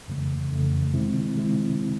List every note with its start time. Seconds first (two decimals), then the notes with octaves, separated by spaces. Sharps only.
0.08 F2 C#3 E3 A3
0.51 F2 C#3 E3 A3
0.93 C3 D#3 G#3 C4 E4
1.36 C3 D#3 G#3 C4 E4